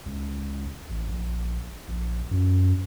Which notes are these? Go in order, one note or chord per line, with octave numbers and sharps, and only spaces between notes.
C#2
A1
A#1
A#1
F#2